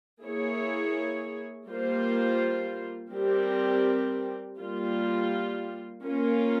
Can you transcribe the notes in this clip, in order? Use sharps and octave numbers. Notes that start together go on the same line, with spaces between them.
A#3 E4 G#4 C#5
G3 A#3 F4 C5
G3 C4 G4 A#4
G3 A#3 F4
A#3 C#4 F4 A#4